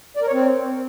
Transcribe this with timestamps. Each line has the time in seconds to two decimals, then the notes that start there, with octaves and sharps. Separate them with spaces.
0.17 D5
0.22 A#4
0.28 C#5
0.33 C4